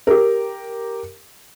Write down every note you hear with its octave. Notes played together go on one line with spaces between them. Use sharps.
G4 A#4